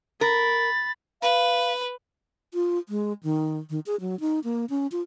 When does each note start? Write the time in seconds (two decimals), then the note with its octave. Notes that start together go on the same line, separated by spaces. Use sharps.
0.21 A#4 B5 A6
1.22 B4 F5
2.54 F4
2.89 G#3
3.23 D#3
3.70 D#3
3.86 G#4
4.01 F#3
4.20 D#4
4.44 A#3
4.70 C#4
4.92 F4